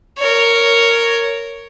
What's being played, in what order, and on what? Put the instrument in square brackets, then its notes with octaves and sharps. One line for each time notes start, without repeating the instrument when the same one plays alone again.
[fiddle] A#4 C#5